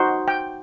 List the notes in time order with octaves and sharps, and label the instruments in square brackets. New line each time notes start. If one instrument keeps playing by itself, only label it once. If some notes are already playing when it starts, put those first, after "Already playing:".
Already playing: [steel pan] D#4 F#4 C5
G5